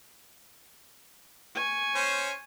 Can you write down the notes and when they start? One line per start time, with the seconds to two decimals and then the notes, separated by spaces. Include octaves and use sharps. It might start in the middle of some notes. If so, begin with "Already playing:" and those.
1.55 G#5 C#6
1.95 C#4 C5